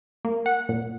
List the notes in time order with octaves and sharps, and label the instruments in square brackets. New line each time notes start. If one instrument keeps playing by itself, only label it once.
[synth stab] A#3
F#5
A#2